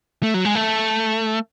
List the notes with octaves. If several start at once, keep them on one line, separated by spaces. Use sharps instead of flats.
A3
F#3
G#3
A3